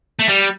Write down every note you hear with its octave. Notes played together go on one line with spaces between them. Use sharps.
A3
G3